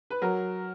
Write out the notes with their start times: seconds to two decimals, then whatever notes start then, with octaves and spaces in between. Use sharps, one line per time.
0.10 B4
0.22 F#3 A#4